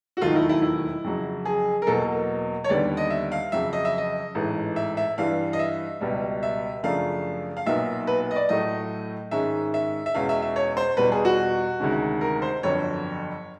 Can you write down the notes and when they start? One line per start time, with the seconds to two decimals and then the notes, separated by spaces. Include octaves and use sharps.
0.17 F#4
0.21 E1 D#2 D#3 F#3 A3 F4
0.31 D#4
0.36 E4
0.49 E4
0.62 E4
1.04 F2 C#3 F#3
1.45 G#4
1.82 A#4
1.87 E2 B2 F#3 A#3 A4
2.64 C#5
2.69 D#2 D3 G3 B3 D5
2.97 D#5
3.10 E5
3.32 F5
3.52 F2 C#3 F#3 E5
3.73 D#5
3.85 E5
3.98 D#5
4.35 A1 G#2 E3 A3
4.76 E5
4.97 E5
5.18 G2 E3 G3 F5
5.53 D#5
5.59 E5
6.01 C#2 B2 G3
6.43 E5
6.83 F#2 C#3 F3 A3 D4 F5
7.57 F5
7.66 B1 A#2 F#3 B3 D#4 E5
8.07 B4
8.31 D#5
8.36 D5
8.49 A2 F#3 A3 D#5
9.31 G#2 D#3 G#3 C#4 E5
9.74 E5
10.06 E5
10.15 E2 B2 G#3 C#4 F5
10.29 E5
10.42 E5
10.56 C#5
10.77 C5
10.97 E2 B2 G3 B4
11.12 G#4
11.25 F#4
11.80 D2 C3 D#3 G#3 C#4
12.21 A#4
12.42 C5
12.63 G1 F2 D3 F#3 C#5